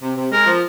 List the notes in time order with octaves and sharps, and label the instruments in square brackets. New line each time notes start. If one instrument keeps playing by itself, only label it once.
[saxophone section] C3
C3
[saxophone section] G#3 [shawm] A#4
[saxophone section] F3